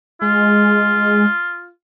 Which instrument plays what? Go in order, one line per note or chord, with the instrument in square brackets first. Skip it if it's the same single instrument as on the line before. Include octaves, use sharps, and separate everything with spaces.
[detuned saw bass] G#3 [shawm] F4